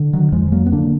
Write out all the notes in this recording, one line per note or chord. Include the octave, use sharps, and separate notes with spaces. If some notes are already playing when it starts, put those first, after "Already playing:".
Already playing: D3
D#3 F#3
F2 F3 G#3
F#3 A#3
B3
D3 A#3 D4